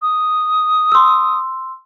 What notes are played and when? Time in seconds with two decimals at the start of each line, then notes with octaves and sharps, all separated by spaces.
0.02 D#6
0.92 C6 E6